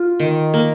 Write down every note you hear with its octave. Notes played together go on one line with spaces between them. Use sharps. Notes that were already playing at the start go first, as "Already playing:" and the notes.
Already playing: F4
D#3
A#3